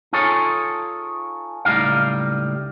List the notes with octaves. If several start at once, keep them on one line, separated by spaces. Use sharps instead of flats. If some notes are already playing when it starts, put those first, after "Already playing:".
D#4 F4 G#4 A4 C#5
C#2 A2 F#3 G3 D#4 F5